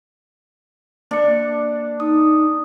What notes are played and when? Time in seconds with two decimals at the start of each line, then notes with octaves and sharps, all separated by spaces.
1.11 A#3 D4 C#7
2.00 D#4 D#6